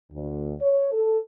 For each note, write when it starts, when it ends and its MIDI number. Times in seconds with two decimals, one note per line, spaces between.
0.12 0.53 38
0.60 0.90 73
0.92 1.19 69